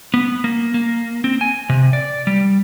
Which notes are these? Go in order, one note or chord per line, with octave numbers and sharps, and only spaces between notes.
B3
A#3
A#3
C4
G#5
C3
D5
G3